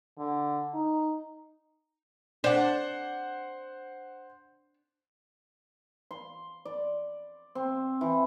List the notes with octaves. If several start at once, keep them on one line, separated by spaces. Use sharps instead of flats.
D3
D#4
D4 C5 F#5
C6
D5
C4
E3